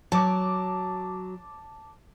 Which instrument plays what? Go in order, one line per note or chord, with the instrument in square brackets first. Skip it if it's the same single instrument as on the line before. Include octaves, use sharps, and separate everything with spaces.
[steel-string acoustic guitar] F#3 [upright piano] A5 D6